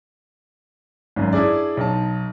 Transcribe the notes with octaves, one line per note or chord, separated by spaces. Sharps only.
G#1 F#2
D4 E4 G#4 D5
B1 D#4 A5